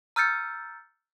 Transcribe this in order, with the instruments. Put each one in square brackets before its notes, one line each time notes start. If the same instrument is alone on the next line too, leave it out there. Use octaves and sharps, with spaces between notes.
[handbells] A#5 E6 F6 G6 A6 C#7